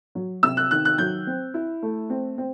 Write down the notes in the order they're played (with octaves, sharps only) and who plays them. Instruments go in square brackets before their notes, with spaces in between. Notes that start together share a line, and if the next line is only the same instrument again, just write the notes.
[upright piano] F#3
C3 E6
F#6
D#3 F#6
F#6
F#3 G6
C4
E4
A3
C4
C4